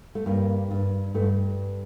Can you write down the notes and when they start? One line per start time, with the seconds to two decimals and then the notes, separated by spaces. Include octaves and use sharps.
0.15 A3
0.26 G2 A#3
0.71 G2
1.14 G2 A3